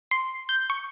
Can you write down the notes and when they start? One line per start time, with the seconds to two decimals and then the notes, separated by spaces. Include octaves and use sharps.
0.11 C6
0.49 G6
0.70 C#6